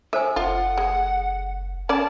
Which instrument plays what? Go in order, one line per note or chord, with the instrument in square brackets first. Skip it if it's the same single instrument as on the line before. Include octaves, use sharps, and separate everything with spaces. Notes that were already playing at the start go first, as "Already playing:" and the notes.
[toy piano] A4 C5 G#5 [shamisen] E5
[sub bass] F#1 [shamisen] F4 [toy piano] A4 [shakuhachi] F#5
[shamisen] G#3
[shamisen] C#4 D5 [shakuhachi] A5